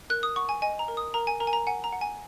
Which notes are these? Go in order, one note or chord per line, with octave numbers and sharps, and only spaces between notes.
A#4 F#6
D#6
F#5 C#6
G#5
D#5 G#5
A#5
A#4
D#6
A#4 A#5
G#5
A#4 A#5
G#5
A#5
F#5 G#5
A#5
F#5
G#5